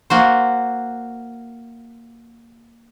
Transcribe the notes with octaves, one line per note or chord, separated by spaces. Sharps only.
A#3 F#4 C5